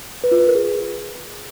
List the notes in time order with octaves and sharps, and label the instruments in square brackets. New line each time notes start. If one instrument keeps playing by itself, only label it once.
[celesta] B4
F4
B4
A#4
G#4